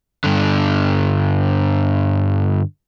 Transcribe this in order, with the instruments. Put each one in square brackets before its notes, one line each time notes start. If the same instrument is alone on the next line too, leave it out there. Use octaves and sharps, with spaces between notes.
[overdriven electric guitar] G2 D3